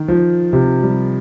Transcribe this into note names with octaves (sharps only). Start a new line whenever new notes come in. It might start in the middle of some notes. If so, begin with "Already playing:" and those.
Already playing: D#3
F3
C3
G3